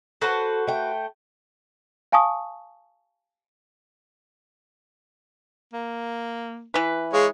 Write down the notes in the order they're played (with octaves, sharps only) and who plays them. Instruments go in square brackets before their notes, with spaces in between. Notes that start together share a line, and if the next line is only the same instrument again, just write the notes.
[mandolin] F#4 B4 C5 [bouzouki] A4
[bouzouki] A3 G5
[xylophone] F5 G#5 A5 C#6 D#6
[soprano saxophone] A#3
[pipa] E3 B4
[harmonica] G#3 C#5 [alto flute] G#4 [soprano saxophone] F5